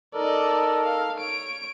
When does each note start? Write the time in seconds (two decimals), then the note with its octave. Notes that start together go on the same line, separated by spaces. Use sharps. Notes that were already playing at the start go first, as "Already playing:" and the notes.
0.15 D#4 A4 A#4 D5 D#5
0.84 F5
1.18 C#5 D7